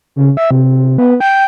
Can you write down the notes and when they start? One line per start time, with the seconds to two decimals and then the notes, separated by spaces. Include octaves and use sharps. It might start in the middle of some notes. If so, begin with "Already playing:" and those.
0.16 C#3
0.37 E5
0.51 C3
0.98 B3
1.20 G5